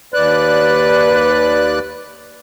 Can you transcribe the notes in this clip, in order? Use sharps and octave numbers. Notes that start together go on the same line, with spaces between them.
D#2 B4 D5 F#6